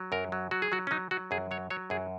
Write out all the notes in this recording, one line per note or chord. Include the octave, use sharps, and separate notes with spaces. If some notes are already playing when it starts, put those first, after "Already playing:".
Already playing: F#3
F#2 A#4
F#3
F#3 F#4
G#4
F#3 F#4
C#4
F#3 D#4
F#3 F#4
F#2 G#4
F#3 C#5
F#3 C#5
F#2 G#4